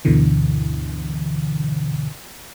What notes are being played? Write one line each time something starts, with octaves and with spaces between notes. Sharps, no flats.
D2 G2 B2 D3 E3